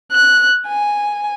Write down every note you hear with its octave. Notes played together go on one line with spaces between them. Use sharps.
F#6
G#5